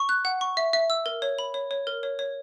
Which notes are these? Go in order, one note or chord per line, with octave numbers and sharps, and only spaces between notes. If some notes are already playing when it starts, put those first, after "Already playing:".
Already playing: C#6
F#6
F#5
C#6
E5
E5
E6
A#4
C#5
B5
C#5
C#5
A#4
C#5
C#5